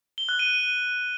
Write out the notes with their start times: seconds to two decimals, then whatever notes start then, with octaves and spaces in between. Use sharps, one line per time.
0.18 G7
0.29 F#6
0.39 D#7